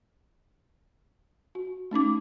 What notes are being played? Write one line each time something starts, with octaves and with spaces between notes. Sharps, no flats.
F#4
A3 C#4 D#4 D6